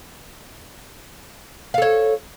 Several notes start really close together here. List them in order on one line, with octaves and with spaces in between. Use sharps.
F5 A4 C#5